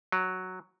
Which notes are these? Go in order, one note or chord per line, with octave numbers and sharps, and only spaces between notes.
F#3